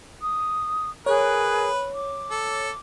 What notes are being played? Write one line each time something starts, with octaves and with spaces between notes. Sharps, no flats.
D#6
G#4 A#4 B4 C#5 F#6
D6
A4